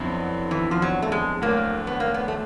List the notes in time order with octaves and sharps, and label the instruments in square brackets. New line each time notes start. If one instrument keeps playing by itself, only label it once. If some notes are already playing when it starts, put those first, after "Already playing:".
Already playing: [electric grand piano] F2 D3 F#3 B3 E4
[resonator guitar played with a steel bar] E3
F3
F#3
A3
G#3
[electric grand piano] D2 D3 F#3 A3 [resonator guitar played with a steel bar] A#3
[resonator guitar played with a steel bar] B3
A#3
B3
A3